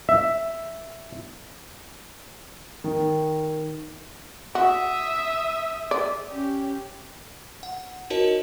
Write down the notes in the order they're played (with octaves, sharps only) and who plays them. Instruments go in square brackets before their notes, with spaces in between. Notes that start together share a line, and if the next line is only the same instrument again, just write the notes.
[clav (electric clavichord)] E5
[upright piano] D#3
[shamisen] F#4 [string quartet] E5 D#6
[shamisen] D5
[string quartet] C#4 G4
[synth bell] F#5
D#4 F#4 A#4 C#5 D#5 A5